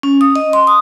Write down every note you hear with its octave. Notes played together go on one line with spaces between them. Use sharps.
C#4
D#6
D#5
C6
D#6